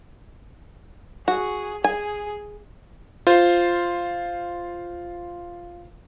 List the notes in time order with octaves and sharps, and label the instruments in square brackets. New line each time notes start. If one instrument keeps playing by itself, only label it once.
[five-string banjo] F#4 [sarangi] G#4
[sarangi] G#4 [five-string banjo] G#5
[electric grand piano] F4 C5